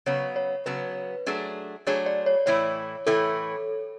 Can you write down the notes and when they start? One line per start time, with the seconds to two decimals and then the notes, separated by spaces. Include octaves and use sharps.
0.06 C#3 F#3 B3 C#5
0.36 C#5
0.66 C#3 F#3 B3 B4
1.26 F#3 A3 D4 G#4
1.87 F#3 A3 D4 G#4 C#5
2.06 D5
2.26 C#5
2.46 A2 E3 A3 E4 C#5
3.07 A2 E3 A3 E4 A4